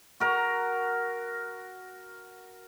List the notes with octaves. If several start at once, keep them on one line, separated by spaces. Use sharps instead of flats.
F#4 A#4 A#5